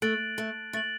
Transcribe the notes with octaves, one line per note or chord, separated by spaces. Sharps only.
A3 F#6 A6 D7 F#7
A3
A3 F#6 A6 D7 F#7